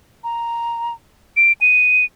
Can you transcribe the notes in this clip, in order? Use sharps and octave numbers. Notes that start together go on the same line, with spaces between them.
A#5
D7
D#7